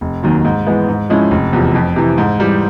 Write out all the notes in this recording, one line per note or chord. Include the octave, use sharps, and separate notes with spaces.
F1
D#2 D#3 F#3
G#2
E3 G#3 B3
G#2
F3 G#3 C#4 E4
F1
E2 C3 F3
F2
C3 E3
G#2
E3 G3